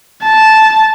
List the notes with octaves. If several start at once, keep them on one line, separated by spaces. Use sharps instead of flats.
A5